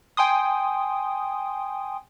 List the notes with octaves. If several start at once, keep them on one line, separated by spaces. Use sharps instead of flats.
G5 G#5 C6 D#6